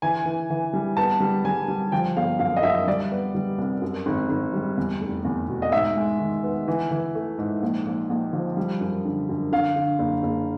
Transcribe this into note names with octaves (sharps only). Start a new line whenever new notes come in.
E3 G#5
E3
E3
G3
B3 A5
G3
G3 G#5
G3
F3 G5
G1 F5
F#2 F5
D#5
F#2 E5
G3 D5
B3
G3
C2
F#2
G#1
G#1
G3
E2
F1
E2
B2
D#5
G#2 E5
G#3
D#3
B3
E3
E3
A3
G#2
A#1
A#1
A#1
F3
G3
F#2
D3
F#2
D3 F5
D3
F#1
F#1